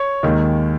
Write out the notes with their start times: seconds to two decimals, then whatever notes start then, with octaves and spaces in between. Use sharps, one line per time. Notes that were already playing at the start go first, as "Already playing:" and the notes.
Already playing: C#5
0.23 D#2 D#3 G#3